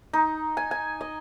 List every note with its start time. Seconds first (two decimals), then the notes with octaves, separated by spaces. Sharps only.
0.13 D#4
0.57 G#5
0.71 G#5
1.01 D#5